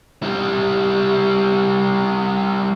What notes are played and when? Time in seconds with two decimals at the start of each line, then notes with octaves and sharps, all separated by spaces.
0.23 G3 E4